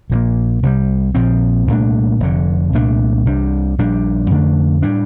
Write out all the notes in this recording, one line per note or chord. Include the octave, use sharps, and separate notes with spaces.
A#1 A#2 F3
A#3
C2 C3 D#3 G3
A#1 A#2 F3 C4
C2 A#2 A3 D4
F1 F2 D3
C2 A#2 A3 D4
C2 C3 G3 D4
A#1 A#2 G3 D4
F2 D3 A3 D4
A2 G3 D4